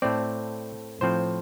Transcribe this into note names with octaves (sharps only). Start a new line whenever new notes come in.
A2 A3 C4 D5
A2 F3 C4 C5